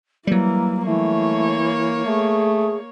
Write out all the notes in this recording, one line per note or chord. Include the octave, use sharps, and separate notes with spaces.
E3 F#3 G3 A#3
E3 A3 A#3 C#5
A3 G#4